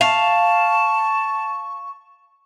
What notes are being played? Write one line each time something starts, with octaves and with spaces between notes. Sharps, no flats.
F5 A5 C#6